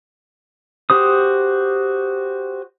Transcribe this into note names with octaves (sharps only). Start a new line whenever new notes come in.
F#4 G4 C5 D#6